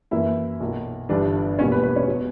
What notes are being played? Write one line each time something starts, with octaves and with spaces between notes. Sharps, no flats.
F#2 E3 A#3 E4 E5
B1 A#2 A#3
G1 G2 E3 G3 D4 D5
E1 E2 B2 G3 A#3 C#4 C#5
B4
B4
C#4 C#5
B2 F#3